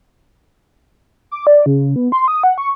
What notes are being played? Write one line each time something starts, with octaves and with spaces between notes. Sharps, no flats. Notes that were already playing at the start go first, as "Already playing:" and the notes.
D6
D5
C#3
B3
C6
D#6
F#5
C#6